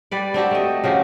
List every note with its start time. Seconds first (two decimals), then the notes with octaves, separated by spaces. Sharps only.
0.11 G3 B4 D5
0.34 C4 D4 F#4 G4
0.51 A3 D#5
0.84 C#3 F3 F#4 G4